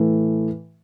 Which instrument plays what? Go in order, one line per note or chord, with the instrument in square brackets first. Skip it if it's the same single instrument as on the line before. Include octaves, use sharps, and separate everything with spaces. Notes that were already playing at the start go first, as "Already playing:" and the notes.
Already playing: [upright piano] A2 E3 A3